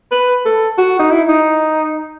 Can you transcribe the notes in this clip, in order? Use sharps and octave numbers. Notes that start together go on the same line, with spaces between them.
B4
A4
F#4
D#4
E4
D#4